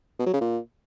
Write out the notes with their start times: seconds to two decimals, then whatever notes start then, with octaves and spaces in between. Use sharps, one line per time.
0.19 B2
0.26 F#3
0.34 C#3
0.41 A#2